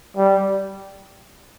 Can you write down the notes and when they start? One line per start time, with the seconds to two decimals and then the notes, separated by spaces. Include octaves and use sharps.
0.17 G3